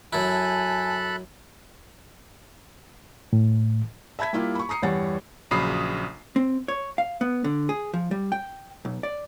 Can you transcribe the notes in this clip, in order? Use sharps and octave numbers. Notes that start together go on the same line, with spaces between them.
F#2 E4 A4 G#5 A5 B5 F#6
A2
E5 A5 B5 G#6 B6
G3 A#3 E4 F4 G4
B5 C#6
A#5 D#6 C7 C#7
E2 G2 G3 C#5 F#5 A6
A#1 C#3 F#3 B5 D#6 C7
C4
C#5
F5
B3
D3
G#4
F3
G3
G5
B1
D5